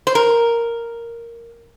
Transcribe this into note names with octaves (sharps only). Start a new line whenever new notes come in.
C5
A#4